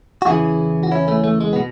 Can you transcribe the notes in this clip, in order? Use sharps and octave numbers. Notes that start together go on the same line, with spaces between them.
F#4
E2 C#3 E3 E4 G#4
F#4
C#4 E4
A3 C#4
A3
G#3
B3
B2